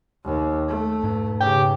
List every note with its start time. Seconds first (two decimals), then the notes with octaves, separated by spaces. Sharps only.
0.25 D#2
0.69 A3
1.04 G#2 D4
1.40 C#3 G4